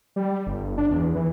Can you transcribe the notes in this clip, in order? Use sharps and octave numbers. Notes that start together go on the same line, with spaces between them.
G3
G1
D4
E2
E3